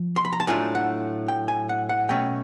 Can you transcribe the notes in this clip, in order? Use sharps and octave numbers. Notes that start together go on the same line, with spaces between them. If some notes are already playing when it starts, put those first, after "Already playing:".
Already playing: F3
C6
B5
A#5
A5
A2 F#3 A3 D4 F4 G#5
F#5
G5
G#5
F#5
F#5
B2 F#3 A3 C#4 G5